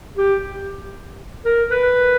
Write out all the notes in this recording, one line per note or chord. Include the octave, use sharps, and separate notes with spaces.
G4
A#4
B4